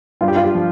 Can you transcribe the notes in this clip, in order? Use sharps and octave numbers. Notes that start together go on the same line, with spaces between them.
G2 F4
G4
F4
G4
F3